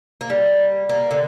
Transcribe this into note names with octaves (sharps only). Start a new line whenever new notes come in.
A#3
G3
A#3
D3